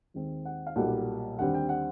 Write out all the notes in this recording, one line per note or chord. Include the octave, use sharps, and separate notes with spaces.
D#2 D#3 G#3 C4
F#5
F5
B1 A#2 G3 A#3 F#5
D#2 D3 G3 C4 F#5
G5
F#5